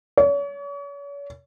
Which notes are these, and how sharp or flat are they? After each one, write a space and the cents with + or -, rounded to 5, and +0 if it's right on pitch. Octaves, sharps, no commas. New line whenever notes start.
C#5 +40